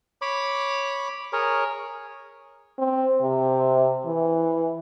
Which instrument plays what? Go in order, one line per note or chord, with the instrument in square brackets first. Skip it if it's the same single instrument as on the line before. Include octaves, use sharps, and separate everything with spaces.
[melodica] C#5 B5 D6
G#4 A#4 C#5
[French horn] C4
C3
E3